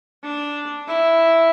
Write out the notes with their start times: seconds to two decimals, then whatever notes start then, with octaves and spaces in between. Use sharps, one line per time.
0.23 D4
0.88 E4